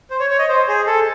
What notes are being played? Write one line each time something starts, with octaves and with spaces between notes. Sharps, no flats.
C5
C#5
C#5
D#5
C5
G#4
A4